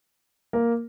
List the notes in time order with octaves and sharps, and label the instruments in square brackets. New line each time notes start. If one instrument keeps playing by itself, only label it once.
[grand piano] A#3 A#4